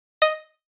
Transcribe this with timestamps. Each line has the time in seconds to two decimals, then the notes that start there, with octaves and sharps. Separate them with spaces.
0.22 D#5